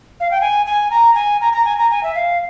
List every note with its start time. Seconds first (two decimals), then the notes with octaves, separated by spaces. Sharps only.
0.20 F5
0.31 G5
0.41 G#5
0.66 G#5
0.91 A#5
1.15 G#5
1.41 A#5
1.53 A#5
1.65 G#5
1.78 A#5
1.90 G#5
2.03 E5
2.15 F5